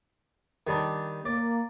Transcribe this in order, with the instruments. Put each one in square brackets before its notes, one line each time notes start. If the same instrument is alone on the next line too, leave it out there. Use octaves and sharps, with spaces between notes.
[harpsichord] D#3 G3 D4
[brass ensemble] A#3 [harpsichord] D5